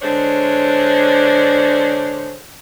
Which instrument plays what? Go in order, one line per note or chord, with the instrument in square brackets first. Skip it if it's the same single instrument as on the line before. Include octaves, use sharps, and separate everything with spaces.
[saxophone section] D3 G#3 D4 C5 C#5